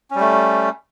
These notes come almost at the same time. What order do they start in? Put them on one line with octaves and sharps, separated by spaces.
C#4 G3 A3